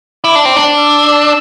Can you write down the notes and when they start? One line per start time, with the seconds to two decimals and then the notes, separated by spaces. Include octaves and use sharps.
0.24 E4 D6
0.35 D4
0.45 C4
0.56 D4
0.79 E6